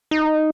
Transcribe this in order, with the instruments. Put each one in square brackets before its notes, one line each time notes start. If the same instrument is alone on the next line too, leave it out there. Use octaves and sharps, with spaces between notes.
[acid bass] D#4